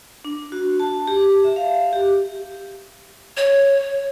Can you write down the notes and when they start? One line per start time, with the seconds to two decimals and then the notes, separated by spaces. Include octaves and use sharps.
0.25 D4
0.52 F#4
0.80 A5
1.08 G4
1.44 E5
1.56 F5
1.93 G4
3.37 C#5